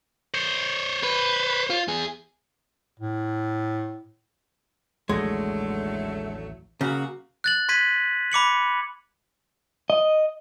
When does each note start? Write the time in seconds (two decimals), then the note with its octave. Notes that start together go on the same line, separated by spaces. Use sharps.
0.34 C5 C#5
1.03 B4
1.70 F4
1.88 E2 G#4
2.99 A2
5.09 A1 D#2 D3 F#3 G#3 A3
6.81 C#3 F#3 A#3 F#4
7.44 F#6 A6 F#7
7.69 C6 G#6 B6 D#7
8.32 B5 D6 C#7 F#7
9.90 D#5